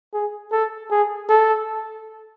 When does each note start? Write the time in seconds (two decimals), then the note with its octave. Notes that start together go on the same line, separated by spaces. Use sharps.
0.14 G#4
0.52 A4
0.91 G#4
1.30 A4